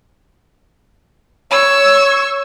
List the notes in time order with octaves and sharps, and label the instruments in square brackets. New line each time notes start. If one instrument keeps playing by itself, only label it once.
[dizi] C#5 [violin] C#6 E6